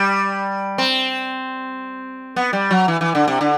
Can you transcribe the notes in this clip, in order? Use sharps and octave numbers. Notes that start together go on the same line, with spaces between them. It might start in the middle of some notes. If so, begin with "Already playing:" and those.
Already playing: G3
C4
B3
G3
F#3
E3
E3
D3
C3
D3